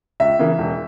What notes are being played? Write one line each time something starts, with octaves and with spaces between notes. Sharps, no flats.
C#2 E5
C#3 E3 A#3
E1